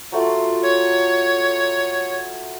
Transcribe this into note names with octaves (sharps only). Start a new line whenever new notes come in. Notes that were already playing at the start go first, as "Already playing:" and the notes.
F#3 A3 F4
C#5